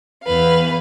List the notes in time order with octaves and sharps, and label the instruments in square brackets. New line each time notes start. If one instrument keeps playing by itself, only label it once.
[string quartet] E2 B4 F5